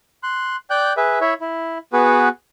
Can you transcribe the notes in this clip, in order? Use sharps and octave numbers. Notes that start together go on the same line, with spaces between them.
C6 F#6
D5 G5 F#6 G6
G#4 B4 E5
E4 C#5 E5
E4
B3 F#4 G#4 B4